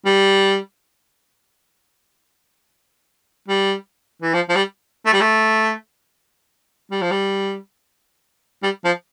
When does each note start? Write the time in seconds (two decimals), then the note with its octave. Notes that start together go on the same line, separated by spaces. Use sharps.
0.05 G3
3.48 G3
4.22 E3
4.34 F3
4.49 F3
4.56 G3
5.06 A3
5.13 G3
5.21 A3
6.91 G3
7.02 F3
7.11 G3
8.63 G3
8.85 F3